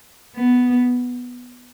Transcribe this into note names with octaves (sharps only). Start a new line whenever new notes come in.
B3